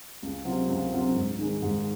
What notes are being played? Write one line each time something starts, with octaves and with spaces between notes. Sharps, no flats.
C#2
C3 F#3 C4 F4
C#2
C3 F#3 C4 F4
G#2
D#3 G#3
G#2